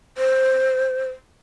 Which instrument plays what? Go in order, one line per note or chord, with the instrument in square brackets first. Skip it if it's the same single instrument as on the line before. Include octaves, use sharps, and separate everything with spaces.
[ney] C5